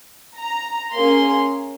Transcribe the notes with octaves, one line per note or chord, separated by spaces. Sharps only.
A#5
A#3 C#4 G#4 C6